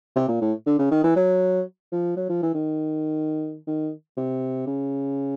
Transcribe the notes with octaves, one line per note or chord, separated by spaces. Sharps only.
C3
A#2
A2
D3
C#3
D#3
E3
F#3
F3
F#3
F3
E3
D#3
D#3
C3
C#3